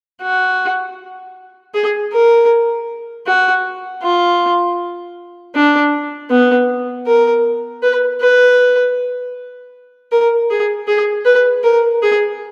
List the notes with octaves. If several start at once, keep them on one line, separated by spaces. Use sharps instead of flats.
F#4
G#4
A#4
F#4
F4
D4
B3
A#4
B4
B4
A#4
G#4
G#4
B4
A#4
G#4